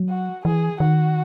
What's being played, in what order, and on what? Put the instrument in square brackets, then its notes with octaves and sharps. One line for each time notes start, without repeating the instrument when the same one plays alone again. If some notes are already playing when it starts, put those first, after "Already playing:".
Already playing: [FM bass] F#3
[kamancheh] F#4
[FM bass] E3 [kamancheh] G#4
[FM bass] D#3 [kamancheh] F#4